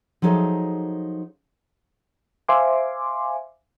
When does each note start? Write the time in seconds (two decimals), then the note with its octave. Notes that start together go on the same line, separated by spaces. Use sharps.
0.22 F3 F#3 D#4 G#4 A4 E5
2.49 C5 E5 F5 G#5 C6 D6